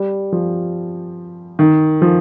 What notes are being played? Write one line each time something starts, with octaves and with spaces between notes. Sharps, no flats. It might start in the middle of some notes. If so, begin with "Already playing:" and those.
Already playing: G3
F3
D#3
F3